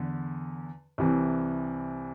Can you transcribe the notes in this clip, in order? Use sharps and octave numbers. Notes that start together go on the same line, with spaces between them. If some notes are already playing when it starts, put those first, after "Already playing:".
Already playing: E2 D3
C2 C3 E3